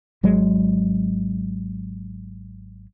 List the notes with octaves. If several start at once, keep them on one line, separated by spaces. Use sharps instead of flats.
G#1 F#3 G#3